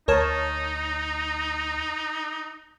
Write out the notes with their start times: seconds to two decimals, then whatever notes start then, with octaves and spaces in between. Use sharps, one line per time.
0.08 D2 D#4 A#4 C#5 A5